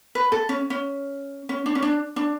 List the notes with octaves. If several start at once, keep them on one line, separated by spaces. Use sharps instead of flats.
B4
A4
C#4
C#4
C#4
D4
C#4
D4
D4